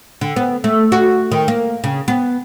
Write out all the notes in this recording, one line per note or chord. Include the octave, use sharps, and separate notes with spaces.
D3
B3
A3
F#4
D#3
A#3
C#3
B3